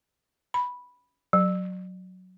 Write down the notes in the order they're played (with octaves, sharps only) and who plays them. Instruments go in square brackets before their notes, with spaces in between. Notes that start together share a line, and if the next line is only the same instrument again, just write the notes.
[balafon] B5
F#3